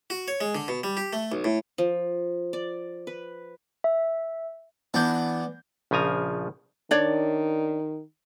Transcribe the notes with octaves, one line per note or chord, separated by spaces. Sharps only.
F#4
C#5
G#3
D3
B2
G3
G4
A3
B1
A2
F3
D5
B4
E5
E3 B3 D4 G6
A#1 C#3 F3 G#5 A#5
D#3 D4 C#5 D5